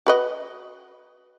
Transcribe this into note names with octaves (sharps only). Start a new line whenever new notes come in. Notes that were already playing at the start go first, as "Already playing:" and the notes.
F#4 B4 D#5